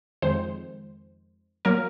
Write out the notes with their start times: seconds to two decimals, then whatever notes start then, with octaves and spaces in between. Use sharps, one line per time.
0.22 F2 D#3 G#3 C5
1.65 F#3 A#3 A#4